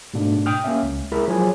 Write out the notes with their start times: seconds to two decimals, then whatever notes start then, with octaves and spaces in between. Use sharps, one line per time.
0.14 G#2 B2 A3 D4
0.46 G5 D#6 F6
0.64 A#3 C#4 E5
0.83 C#2
1.12 G#3 E4 G#4 A#4 E5
1.28 F3 F#3 G#4 C#5 G#5